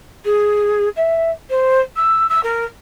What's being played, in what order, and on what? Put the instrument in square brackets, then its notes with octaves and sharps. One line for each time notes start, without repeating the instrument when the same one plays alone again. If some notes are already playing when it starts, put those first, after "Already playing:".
[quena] G#4
E5
C5
E6
E6
A#4